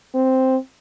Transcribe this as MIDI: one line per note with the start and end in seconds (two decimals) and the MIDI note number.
0.15 0.56 60